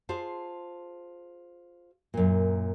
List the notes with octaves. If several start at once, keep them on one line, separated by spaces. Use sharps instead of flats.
F4 G#4 C5 A5
F#2 A#2